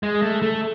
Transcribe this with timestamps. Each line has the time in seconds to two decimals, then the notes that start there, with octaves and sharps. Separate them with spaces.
0.03 G#3
0.22 A3
0.42 A3